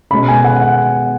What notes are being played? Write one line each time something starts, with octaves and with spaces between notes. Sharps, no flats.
B2 G#3 C#4 B5
G#5
F#5
F#5